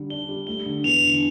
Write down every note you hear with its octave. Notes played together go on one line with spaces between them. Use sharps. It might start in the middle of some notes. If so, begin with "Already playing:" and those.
Already playing: D3 G3
D4 G7
G3
A3 G7
D3
E2 F7
D3